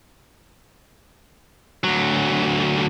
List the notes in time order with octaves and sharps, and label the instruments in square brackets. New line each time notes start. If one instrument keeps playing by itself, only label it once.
[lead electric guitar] D2 F#3